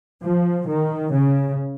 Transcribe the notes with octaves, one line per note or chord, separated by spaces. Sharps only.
F3
D#3
C#3